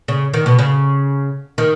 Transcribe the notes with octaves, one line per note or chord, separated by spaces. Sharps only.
C#3
D#3
B2
C#3
D#3